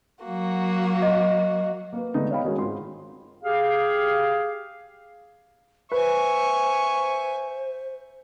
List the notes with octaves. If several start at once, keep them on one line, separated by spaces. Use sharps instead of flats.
F#3 A#3 F#4
D#5
A#3 B4
D3 G#3 A3 B3 D#4
C#5 D#5 F5 G5 B5
D#3 G#3 C#4 F#4 G#4 A#4
G#1 F4 C6
G4 G#4 F5
B4 C5 E5 G#5 C#6